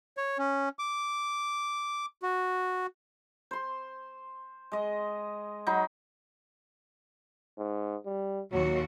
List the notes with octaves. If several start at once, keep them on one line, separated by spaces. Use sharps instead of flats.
C#5
C#4
D6
F#4
C5 C6
G#3 D#5
F#3 D#4 B5
G#2
G3
D#2 A#2 F#3 F#4